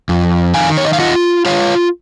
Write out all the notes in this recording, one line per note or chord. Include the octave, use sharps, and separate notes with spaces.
F2
D#3 F5 G#5
C#5
D#5
F5
F4 D#5 F#5
F4 C#5 F5